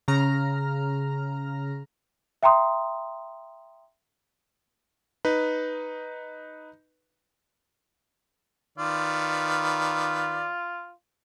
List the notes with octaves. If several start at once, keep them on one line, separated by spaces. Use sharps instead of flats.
C#3 A#5 F6
E5 G5 A#5 C6 D#6
D#4 B4
D#3 F4 B4 D5